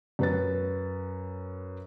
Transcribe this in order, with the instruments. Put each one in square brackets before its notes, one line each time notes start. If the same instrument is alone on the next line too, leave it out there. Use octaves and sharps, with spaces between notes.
[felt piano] F#2 B4 A6